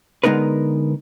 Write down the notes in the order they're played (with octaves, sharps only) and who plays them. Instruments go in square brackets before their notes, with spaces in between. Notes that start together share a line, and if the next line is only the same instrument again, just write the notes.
[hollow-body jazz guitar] D3 G#3 B3 D#4 A#4 B4